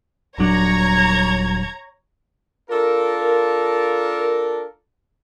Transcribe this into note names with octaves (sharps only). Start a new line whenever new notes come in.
D#1 F#3 D4 C#5 A#5 G#6
D4 F4 A4 A#4